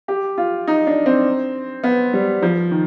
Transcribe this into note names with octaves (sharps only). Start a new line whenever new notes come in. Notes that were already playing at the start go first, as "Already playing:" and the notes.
G4
F4
D#4
D4
C4
B3
G3
F3
D#3